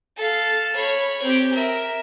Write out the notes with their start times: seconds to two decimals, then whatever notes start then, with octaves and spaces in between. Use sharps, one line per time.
0.17 A4 F5
0.76 C#5 B5
1.23 C4 G4
1.53 A#4 E5